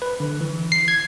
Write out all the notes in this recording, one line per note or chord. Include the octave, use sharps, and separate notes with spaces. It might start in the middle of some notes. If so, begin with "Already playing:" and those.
B4
D3
E3
C7
G#6